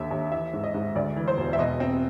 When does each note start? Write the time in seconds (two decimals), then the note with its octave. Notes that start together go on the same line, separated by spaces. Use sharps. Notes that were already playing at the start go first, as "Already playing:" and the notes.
Already playing: D#2 D3 E5
0.11 D#2
0.32 E3 E5
0.53 G#2
0.64 D#5
0.74 G#2
0.95 D2 D5
1.16 E3
1.28 C5
1.37 E1
1.53 E5
1.59 B2 D#5
1.80 C4